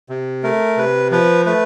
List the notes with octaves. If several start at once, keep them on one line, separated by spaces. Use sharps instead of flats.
C3
A3 A#4
C3 B4
F3 B4
A3 B4